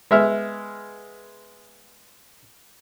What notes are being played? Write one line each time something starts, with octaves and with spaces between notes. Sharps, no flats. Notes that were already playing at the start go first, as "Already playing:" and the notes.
G#3 B3 E5 F6